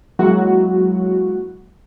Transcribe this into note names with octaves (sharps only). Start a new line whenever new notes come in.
F#3 G#3 A#3 E4 F#4